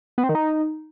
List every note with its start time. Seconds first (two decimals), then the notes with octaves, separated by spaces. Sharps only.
0.18 B3
0.23 C4
0.29 D#3
0.35 D#4